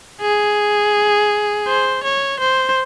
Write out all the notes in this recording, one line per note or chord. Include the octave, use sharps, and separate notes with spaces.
G#4
C5
C#5
C5